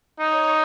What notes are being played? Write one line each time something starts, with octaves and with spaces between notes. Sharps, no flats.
D#4 C#5